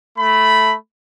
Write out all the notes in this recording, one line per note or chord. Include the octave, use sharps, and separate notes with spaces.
A3 B5